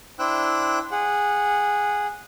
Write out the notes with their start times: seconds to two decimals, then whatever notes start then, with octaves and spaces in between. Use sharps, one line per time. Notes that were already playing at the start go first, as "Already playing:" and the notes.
0.19 D4 E4 C5 G5 E6 F#6
0.91 G#4 F#5